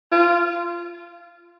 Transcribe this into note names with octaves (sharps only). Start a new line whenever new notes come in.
F4